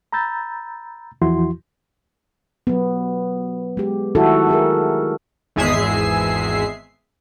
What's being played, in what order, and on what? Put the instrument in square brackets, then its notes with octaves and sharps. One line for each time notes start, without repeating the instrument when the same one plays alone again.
[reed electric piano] A#5 B5 E6 G6 A6
E2 E3 F3 E4 F#4 C6
[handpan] F#3 B3
G#3 G4
D#3 E4 F#4 A4
F#4 G#4 A#4
[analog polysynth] G#1 E2 G#3 G#4 E5 C7